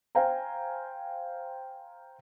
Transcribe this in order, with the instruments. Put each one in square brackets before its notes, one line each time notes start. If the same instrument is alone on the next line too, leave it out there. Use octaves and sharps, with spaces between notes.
[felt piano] C5 F5 G5 G#5 A#5